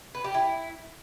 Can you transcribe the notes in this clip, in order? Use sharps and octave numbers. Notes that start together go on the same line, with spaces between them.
B4
G4
E4